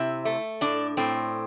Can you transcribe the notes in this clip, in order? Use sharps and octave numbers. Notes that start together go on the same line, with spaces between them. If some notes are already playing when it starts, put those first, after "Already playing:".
Already playing: C3 E4
A3
A2 D4
A2 C4